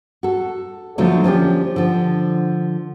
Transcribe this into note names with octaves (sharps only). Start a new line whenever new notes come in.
F#4 A4
D3 F3 F#3 A3 A#3 D4
F3 C#4 D4 G4
D3 F3